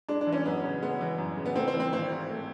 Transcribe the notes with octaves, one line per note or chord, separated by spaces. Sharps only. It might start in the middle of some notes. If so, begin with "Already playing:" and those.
G#3 D4
D4
E3
C#4
F#2 B3
C#3
G#3 B3
E3
F#2
C#3
B3
A3 C4
C4
E3
C4
G#1 C4
G#2
A3